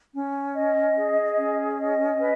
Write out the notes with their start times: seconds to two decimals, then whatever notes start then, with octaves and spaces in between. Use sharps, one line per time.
0.14 C#4
0.55 D#5
0.97 G#4
1.37 C#4
1.79 D#5
2.20 B4